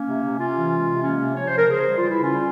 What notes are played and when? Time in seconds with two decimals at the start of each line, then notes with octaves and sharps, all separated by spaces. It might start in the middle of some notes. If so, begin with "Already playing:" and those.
Already playing: A#3 C#4
0.09 C3
0.24 C3
0.40 C3 C#4 F4
0.56 E3
0.72 G#3
0.88 C3
1.03 G#3 A#3 C#4
1.19 C3
1.35 F3 C#5
1.47 F3 C5
1.58 A#4
1.67 C#3 G#4 C5
1.82 G3
1.98 E3 F4
2.10 C#3 E4
2.24 C#4 F4
2.30 G3